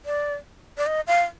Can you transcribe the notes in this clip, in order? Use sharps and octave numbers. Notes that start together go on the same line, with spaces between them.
D5
D5
D#5
F5